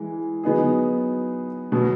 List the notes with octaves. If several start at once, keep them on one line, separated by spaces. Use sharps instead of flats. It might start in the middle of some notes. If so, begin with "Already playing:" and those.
Already playing: E3 G#3
F#3 B3 D#4 G#4
B2 F#3 B3 F#4